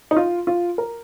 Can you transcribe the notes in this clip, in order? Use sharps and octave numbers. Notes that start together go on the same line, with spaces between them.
D#4
F4
F4
A#4